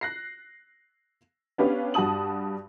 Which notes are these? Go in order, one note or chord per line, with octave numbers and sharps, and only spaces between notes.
F#6 A#6 C7
B3 C#4 D4 G4 B4 F5
G2 F#4 A5 D#6 F#7